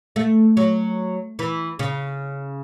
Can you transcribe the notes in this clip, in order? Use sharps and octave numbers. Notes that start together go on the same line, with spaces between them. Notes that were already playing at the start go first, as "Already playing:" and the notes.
A3
F#3
E3
C#3